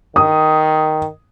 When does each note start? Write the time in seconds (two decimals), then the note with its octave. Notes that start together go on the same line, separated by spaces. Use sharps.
0.16 D#3 D#6